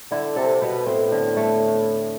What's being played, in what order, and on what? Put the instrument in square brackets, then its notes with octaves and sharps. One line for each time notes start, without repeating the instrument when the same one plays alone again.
[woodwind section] D3 [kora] E4
[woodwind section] C3 [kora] A4
[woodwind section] B2 [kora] B3
[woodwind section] A2 [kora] C4
[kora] D3
A3